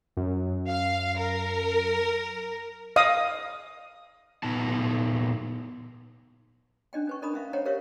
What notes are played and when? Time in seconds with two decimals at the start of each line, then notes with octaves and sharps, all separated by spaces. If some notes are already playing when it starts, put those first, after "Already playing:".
0.17 F#2
0.69 F5
1.17 A#4
2.96 D#5 F5 D#6
4.43 A#2 B3 D#4 A5
6.93 C#4 D4 D#5 G5
7.07 C#4 B4 C#6
7.22 D4 A#4 D#5 A#5 B5 D#6
7.34 C#4 E5 F5
7.53 C5 C#5 D#5 F#5 G5 A#5
7.65 G4 A#4 B4 C#5 E5 F5